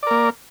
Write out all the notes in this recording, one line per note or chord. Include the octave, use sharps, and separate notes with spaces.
A#3 A#4 D5